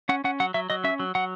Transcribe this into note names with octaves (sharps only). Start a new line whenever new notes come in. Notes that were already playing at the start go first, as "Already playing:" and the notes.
C#4 F#5
C#4 F#5
F#3 F#5
F#3 E5
F#3 D#5
C#4 E5
F#3
F#3 F#5